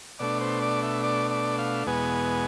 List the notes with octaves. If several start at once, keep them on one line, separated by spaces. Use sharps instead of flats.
B2 A3 D4 D5
C5
D5
E5
D5
D5
F5
E2 B2 G#3 B3 G#5